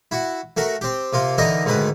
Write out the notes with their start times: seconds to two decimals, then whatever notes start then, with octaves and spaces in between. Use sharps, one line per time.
0.11 E4 F#4
0.57 A3 F#4 A#4
0.81 C4 G4
1.13 C3 A#3 F4
1.38 D3 E3 D#4 A#4 D#5 A#5
1.66 D2 G#2 D#3 G#3 B4